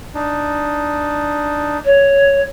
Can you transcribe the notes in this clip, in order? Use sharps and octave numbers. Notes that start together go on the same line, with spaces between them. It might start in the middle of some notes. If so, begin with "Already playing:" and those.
D4 D#4
C#5